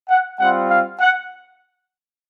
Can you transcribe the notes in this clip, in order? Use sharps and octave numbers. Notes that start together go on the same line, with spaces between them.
F#5
G3 C4 F4 F#5
F5
F#5